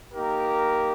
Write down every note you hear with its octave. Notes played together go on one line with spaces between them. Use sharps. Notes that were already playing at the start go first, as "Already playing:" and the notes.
A#3 D#4 G4 A#4